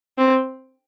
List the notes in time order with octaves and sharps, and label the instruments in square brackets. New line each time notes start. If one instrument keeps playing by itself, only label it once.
[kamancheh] C4